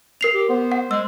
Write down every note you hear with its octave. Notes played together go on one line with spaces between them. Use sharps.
A#4 C7 F7
G4
B3 C5
F#5
G#3 E6